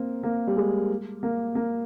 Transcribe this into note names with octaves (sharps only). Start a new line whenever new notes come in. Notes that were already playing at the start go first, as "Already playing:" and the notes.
Already playing: A#3 C4
A#3
G3
G#3
A#3
A#3